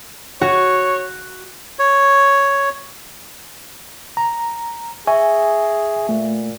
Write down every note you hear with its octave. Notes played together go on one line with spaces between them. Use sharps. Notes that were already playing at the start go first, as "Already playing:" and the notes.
F#4 C#5
C#5
A#5
G#4 E5 G#5 C#6
A#2 A3